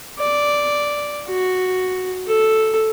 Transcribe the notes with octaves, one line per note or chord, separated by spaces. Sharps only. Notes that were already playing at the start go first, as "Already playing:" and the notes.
D5
F#4
A4